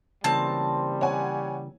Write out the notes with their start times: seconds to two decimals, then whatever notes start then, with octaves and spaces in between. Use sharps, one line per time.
0.24 C#3 E3 G3 A#3 C4 A5
1.01 C#5 F#5 G#5